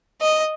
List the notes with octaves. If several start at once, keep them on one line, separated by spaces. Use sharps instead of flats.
D#5